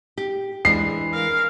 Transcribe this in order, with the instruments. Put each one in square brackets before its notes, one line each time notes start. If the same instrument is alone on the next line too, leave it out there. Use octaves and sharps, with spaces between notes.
[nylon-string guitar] G4
[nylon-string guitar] E3 G#3 D4 [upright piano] C7
[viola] A#4 F5